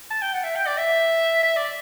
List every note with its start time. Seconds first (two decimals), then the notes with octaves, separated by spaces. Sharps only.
0.11 A5
0.22 G5
0.34 F#5
0.44 E5
0.56 G5
0.66 D5
0.78 E5
1.43 E5
1.56 D5